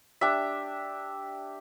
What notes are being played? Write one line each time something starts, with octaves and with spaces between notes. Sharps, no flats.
D4 G4 E5